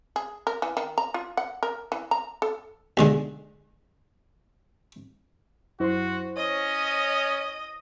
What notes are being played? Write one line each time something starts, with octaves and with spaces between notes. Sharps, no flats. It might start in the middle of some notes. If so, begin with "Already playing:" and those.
G#4
A#4
E3
D#3
A#5
F4
F#5
A#4
E3
A#5
A4
B1 D3 G#3
F#2 E4 F#4 C5 C6
C#4 C#5 D#5